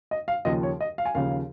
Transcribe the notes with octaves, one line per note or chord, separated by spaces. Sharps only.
D#5
F5
D#2 C#3 F3 D#5
C#5
D#5
F5
G#5
D#2 C#3 F3 F5